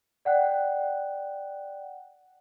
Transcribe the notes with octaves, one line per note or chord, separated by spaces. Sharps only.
D5 F#5 G5 F#6